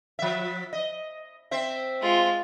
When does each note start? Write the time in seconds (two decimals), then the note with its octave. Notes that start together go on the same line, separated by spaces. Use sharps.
0.19 F3 E5
0.73 D#5
1.51 C4 C5 E5
2.01 G#3 F4